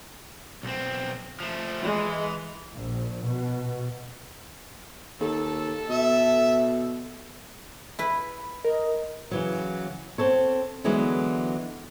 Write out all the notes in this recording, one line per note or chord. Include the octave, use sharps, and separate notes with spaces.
B1 C4
F3 A3
E3 G#3
A#1
B2
D#2 A4
B2 E5
E4 B4
A#4 D#5
C#3 E3 F#3
C4 A4 C#5
D3 E3 F#3 G#3 B3